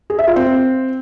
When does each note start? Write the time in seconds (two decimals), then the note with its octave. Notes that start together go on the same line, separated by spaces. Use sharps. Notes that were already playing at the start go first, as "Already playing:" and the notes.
0.10 G#4
0.19 E5
0.27 F4
0.36 C4